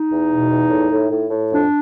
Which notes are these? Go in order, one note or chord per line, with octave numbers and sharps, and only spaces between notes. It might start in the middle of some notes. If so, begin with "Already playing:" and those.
Already playing: D#4
E2
B2
E2
A2
A2
A2
A2
F2 D4